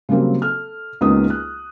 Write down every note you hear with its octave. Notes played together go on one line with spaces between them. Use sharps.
C#3 F#3 G3 A#3 C4
A4 F6
C#2 A#3 B3 C#4 D#4 D#6
F#6